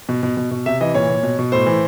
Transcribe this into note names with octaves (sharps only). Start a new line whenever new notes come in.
B2
B2
B2
B2
C3 E5
E3 D#5
A#2 C#5
A#2
B2
B2
A2 C5
E3